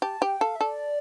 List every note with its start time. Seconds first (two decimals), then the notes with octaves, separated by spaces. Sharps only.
0.02 G4 A5
0.21 G4 G5
0.41 A4 F5
0.56 E5
0.61 A4 D5